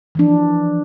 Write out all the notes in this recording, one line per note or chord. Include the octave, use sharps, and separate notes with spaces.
E3 F3 D4